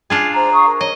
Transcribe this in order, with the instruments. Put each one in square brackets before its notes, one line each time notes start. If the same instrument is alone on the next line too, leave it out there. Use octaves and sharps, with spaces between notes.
[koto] D4 F4 G#4 [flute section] G#5
[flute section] C5 [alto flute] A#5
[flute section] F5 C#6 D#6
A#4
[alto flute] C#5 [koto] D#5